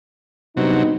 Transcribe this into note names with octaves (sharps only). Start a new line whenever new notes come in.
G2 C3 F#3 B3 D#4